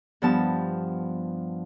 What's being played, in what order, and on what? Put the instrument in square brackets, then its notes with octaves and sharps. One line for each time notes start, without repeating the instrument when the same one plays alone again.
[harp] G2 F3 B3 A5